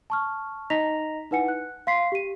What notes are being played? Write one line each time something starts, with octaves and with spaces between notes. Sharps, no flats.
A5 C#6 F6
D#4 D#5 A#5 A#6 B6 F7
D#4 E4 B4 F#5 G#5 C#7
F#6
F5 C6 B6 C7
G4 D#7